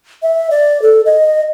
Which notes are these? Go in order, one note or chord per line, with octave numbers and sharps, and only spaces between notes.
E5
D5
A4
D#5